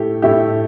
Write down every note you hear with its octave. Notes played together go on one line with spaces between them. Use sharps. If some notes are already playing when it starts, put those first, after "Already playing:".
Already playing: A2 A3 G4
A2 A3 E4 G4